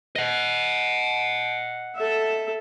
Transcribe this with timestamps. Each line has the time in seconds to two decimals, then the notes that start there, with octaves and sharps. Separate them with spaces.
0.16 D#5 F#5
1.97 A4 E5